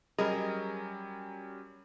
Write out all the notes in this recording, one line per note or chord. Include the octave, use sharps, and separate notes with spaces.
F#3 G3 C#4 G#4 A#4 D#5